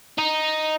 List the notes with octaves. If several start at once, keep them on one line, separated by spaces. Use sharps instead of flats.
D#4